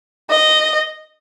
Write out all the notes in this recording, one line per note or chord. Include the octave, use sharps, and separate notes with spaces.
D#5